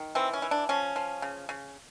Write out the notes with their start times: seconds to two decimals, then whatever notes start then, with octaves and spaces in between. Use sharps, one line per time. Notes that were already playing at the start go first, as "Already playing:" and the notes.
Already playing: D#3
0.15 E3 C4
0.33 C#4
0.42 E3
0.51 D4
0.69 F3 C#4
0.96 F3
1.22 C#3
1.49 C#3